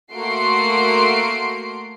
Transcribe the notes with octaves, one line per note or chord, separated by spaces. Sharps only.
A3 A#3 F#4 C6 C7 D7